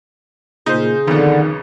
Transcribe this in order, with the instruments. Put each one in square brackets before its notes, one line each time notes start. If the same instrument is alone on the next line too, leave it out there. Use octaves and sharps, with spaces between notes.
[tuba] A#2 [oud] C#3 G#4 [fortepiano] D#4 C5
[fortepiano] B1 F2 [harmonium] D3 [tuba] D#3